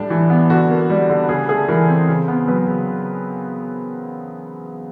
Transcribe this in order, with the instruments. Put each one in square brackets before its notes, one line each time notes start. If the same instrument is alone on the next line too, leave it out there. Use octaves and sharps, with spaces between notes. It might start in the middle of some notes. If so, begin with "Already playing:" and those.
Already playing: [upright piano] A2 G3 D4
E3
B3
D3 F#4
A#3
G3
D3
C#3 G#4
A3 G#4
E3 A#4
C4
C#3
B3
F#3 B4
C#3